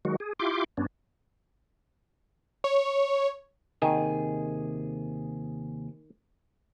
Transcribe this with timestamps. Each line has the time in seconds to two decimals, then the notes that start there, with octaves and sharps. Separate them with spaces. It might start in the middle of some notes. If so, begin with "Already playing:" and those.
0.05 D#3 F#3 G#3 F#4
0.20 G#4
0.39 E4 F4 G4 C6 D6
0.77 G2 B3 C#4 D4
2.64 C#5
3.82 D#2 C3 D#3 G#4